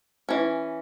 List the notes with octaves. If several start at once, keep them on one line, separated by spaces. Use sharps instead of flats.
E3 C#4